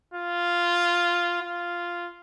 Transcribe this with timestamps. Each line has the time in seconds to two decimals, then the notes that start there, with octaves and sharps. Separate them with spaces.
0.14 F4
1.41 F4